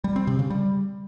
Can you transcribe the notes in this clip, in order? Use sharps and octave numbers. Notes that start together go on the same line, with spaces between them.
G3
C4
C3
C#3
G3